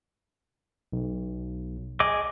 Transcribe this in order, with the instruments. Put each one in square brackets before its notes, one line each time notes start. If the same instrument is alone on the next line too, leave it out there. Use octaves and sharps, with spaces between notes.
[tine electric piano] B1
[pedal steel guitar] G#4 D#5 D6